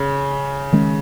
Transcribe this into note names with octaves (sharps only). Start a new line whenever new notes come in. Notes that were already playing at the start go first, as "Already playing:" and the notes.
Already playing: C#3
D#3 G#3 C#4